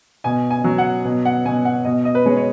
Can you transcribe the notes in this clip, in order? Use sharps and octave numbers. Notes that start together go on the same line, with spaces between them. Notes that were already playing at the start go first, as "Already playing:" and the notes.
B2 G#5
G#5
F#3
F#5
B2
F#5
B2 G#5
F#5
B2 D#5
D#5
B4
G#3 C#5
C#5